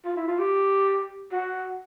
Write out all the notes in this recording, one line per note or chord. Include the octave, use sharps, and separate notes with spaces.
F4
E4
F4
G4
F#4